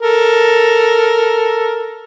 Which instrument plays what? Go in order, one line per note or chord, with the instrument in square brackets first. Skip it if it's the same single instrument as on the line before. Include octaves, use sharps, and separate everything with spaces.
[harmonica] A4 A#4